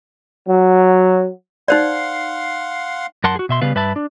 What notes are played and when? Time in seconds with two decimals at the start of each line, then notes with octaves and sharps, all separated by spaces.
0.47 F#3
1.68 D#4 C5 D5 F5 F#5 C6
3.24 F#2 A#4 F#5 A5 C6
3.36 F#4 G#4
3.49 B2 E5 C6
3.61 C#3 G3 B3 B4 F5
3.75 G2 B4 E5 A5 B5
3.96 D4